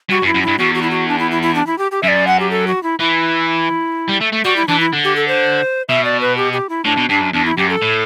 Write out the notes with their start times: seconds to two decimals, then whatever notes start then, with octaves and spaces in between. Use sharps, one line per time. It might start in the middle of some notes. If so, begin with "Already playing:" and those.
0.09 G2 F#4
0.23 F#2
0.27 E4
0.34 F#2
0.43 G2 E4
0.59 E2 F#4
0.74 F#4
0.82 E4
0.91 F#4
1.08 D4
1.19 E4
1.31 E4
1.42 E4
1.55 D4
1.67 E4
1.78 G4
1.91 G4
2.03 F#2 D5 E5
2.27 F#5
2.40 G4
2.51 A4
2.67 F#4
2.83 E4
2.99 E3 E4
4.08 G3
4.20 A3
4.32 A3
4.44 G3 F#4
4.56 E4
4.68 E3 D4
4.80 E4
4.93 D3
5.04 G4
5.16 A4
5.28 C5
5.89 B2 E5
6.05 D5
6.21 B4
6.37 G4
6.53 G4
6.69 E4
6.85 A2 D4
6.97 B2
7.09 G2 D4
7.21 F#2
7.33 E2 D4
7.46 E4
7.58 F#2 G4
7.69 A4
7.82 A2